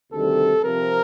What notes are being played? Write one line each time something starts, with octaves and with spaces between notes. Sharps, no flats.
D2 C3 D#3 G3 A4
C3 F3 C4 A#4